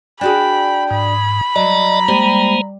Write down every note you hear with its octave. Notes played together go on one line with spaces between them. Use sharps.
D4 F#4 G#4 G5 B5
G#2 B5
F#3 D5 D#5 A#5
G3 G#3 A#3 C5